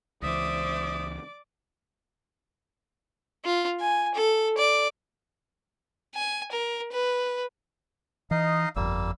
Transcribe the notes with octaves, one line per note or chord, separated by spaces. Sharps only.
C#2 E3 C5 D5 E5 D6 D#6
F4
G#5
A4
D5
G#5
A#4
B4
E3 D#4 D#5 F5
G1 F2 G3 A#3 E6